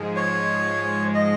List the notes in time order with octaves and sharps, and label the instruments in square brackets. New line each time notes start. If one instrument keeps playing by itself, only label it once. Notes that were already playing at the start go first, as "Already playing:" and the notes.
Already playing: [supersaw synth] G#2 F3 G#3
[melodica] C#5
D#5